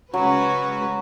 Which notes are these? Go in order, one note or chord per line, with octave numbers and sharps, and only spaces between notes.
C#3 F#3 G#3 C#4 F#4 B4